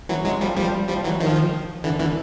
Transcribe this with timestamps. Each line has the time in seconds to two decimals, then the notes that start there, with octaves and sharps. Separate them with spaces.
0.09 E3 F#3
0.25 F#3 G#3
0.41 F3 G3
0.57 F3 G3
0.88 F3 G3
1.04 E3 F#3
1.20 D#3 F3
1.84 D3 E3
2.00 D3 E3